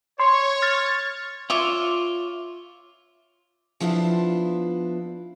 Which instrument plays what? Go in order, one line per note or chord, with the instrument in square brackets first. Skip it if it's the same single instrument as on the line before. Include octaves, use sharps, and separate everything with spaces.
[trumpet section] C#5 [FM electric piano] C6
[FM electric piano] F6 A6
[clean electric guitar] F4 [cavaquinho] C#5 E5 D6
[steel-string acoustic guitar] F3 B3 D4 E4 F4